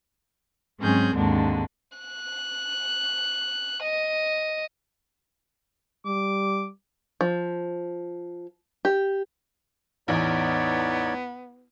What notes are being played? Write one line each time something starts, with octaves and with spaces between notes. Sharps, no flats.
G#2 F#3 C4 C#4 G#4 G6
D#2 G#2 D3 G#3 C4 D4
F#6
D#5
G3 D6
F3
G4
A1 E2 B3 D#4 C#5 D5